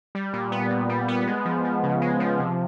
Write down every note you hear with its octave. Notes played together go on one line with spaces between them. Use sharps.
G3
A#2
B3
A#2
G3
B3
G#3
F3
F3
C#3
G#3
F3
C3